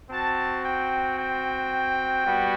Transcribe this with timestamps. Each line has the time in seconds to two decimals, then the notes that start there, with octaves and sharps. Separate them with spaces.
0.10 C4 F#4 A5
0.65 G5
1.18 G5
2.25 G3 B3 F#4